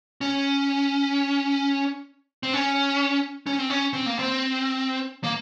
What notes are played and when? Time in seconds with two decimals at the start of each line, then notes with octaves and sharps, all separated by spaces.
0.21 C#4
2.43 C4
2.54 C#4
3.47 C#4
3.59 C4
3.70 C#4
3.93 C4
4.06 A#3
4.19 C4
5.24 A#3